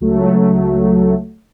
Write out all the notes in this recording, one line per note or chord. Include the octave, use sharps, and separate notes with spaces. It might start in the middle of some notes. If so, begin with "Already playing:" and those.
C#2 F#3 A3